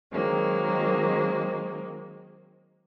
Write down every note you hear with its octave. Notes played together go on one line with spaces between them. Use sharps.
D#3 F#3 G#3 A#3 C4